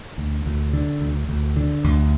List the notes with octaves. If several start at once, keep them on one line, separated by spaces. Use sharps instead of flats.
D2
D2
D3
D2
D2
D3
D2